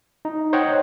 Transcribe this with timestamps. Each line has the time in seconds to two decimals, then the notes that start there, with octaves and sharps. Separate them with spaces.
0.25 D#4
0.53 C5 C#5 D#5 F#5 G5